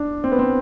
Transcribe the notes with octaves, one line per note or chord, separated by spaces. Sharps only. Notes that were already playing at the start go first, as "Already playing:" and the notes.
Already playing: D4
C4
B3
C4